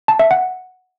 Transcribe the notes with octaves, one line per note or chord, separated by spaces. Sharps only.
A5
E5
F#5